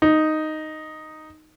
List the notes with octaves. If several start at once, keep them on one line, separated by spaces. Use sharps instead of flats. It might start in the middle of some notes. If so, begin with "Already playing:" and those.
D#4